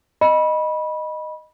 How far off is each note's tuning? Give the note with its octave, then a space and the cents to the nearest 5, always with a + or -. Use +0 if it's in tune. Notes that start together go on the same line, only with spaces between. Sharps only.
D#5 -10 B5 -20